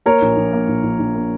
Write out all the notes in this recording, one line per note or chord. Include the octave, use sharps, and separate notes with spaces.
A#3 A#4 C#5
A#1
A#1
A#3
A#1
A#1
A#1
A#3